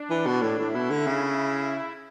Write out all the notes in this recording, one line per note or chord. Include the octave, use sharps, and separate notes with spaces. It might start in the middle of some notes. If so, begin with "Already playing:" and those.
Already playing: D4
E3
B2
A2
A2 E4
B2
D3
C#3